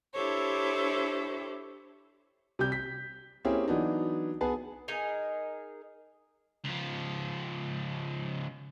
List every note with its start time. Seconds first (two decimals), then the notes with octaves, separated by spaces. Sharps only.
0.14 D4 E4 G4 A4 C5 C#5
2.59 C3 G3 G4 G6
2.72 B6
3.45 A#3 C4 C#4 E4 G4 G#4
3.68 E3 F#3 B3 D4 D#4
4.41 B3 G#4 B4 G#5 A5
4.88 D#4 G#4 A#4
6.64 C#2 F3